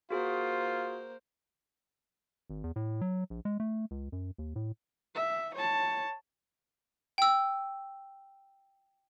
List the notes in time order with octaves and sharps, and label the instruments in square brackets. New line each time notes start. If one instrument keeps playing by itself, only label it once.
[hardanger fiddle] A#3 C5 [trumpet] F4 [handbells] F#4 G#4
[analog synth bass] G#1
E2
A2
F#3
A#1
G#3
A3
C#2
F#2
D#2
A2
[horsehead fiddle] E5
C#5 A5
[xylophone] G5 E6